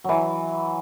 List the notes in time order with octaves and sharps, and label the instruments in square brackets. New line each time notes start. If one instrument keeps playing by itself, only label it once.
[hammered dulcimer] E3 F#3